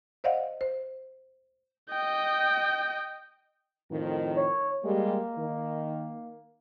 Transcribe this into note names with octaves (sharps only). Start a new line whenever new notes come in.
C5 D5 D#5 F5 F#5
C5
D#5 G5
F2 A2 D#3
C#5
G3 G#3 A#3
D#3